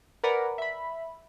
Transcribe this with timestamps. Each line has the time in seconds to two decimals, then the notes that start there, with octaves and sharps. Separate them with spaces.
0.24 A#4 B4 D5 F#5 G#5 B5
0.58 E5 B5